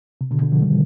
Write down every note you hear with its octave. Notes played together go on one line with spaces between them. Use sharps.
C3
B2 D3
B2 D3
D3 F3
D#3 G3